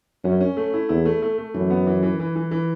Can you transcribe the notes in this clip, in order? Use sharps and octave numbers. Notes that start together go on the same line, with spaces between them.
F#2 C#4
C#4
A3
E4
E2 E4
A3
A3
A3
F#2 E3
B3
E3
E3
E3
E3
E3